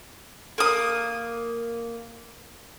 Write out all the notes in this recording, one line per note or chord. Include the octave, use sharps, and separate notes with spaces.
A#3 D#6